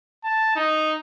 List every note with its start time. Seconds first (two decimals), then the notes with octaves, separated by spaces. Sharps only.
0.24 A5
0.56 D#4